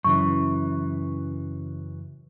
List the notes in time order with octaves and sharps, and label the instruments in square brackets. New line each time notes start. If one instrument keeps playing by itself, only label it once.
[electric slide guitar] F#2 C#3 E3 [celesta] C#6